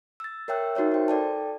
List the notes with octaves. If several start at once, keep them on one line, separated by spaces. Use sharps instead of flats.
E6 A6
A#4 C#5 E5 G5 E6 F#6
D#4 F#4 A#4 C#5 E5
C5 G5
A4 D5 G5 A5